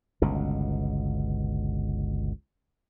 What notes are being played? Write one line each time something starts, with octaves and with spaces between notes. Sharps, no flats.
G1 C#2 B2